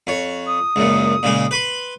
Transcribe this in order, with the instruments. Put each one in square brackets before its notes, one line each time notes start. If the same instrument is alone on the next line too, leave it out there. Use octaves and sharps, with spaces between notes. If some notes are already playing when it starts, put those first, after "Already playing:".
[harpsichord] F2 C#5
[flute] D#6
[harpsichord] C#2 F#2 A#2
A#2 C#3 G#3
B4 B5 C6